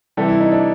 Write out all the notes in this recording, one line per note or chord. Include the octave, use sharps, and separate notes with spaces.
C3 E3 G3 A4
E4
D#4
D4